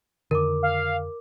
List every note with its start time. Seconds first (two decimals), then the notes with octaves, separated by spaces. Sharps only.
0.31 F2 D3 D#3 A#4 D6
0.63 F5